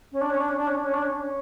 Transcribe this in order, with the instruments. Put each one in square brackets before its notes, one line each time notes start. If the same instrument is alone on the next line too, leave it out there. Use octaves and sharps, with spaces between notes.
[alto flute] C#4
D4
C#4
D4
C#4
D4
C#4
D4
C#4
D4
C#4
D4
C#4